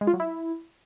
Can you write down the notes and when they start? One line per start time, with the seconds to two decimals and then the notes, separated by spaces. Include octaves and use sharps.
0.01 G#3
0.07 F4
0.14 F#3
0.20 E4